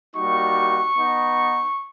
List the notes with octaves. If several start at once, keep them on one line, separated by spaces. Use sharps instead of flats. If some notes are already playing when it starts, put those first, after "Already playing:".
G3 A#3 D#4 F#4 C#6
B3 D#4